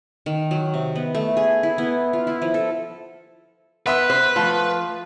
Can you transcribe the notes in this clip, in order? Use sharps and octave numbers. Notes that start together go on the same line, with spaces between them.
D#3
F#3
C3
B3
A3
G#4
E4
B3
F4
E4
F3
A4
B3 B4 E5 C6
C5
F3 A3 F4